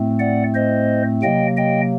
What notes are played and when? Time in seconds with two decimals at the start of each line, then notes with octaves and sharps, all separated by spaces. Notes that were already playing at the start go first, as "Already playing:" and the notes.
Already playing: A2 A3 C4
0.19 D5 F#5
0.54 C5 D#5
1.22 C3 F#3 A#3 D#5 G5
1.57 D#5 G5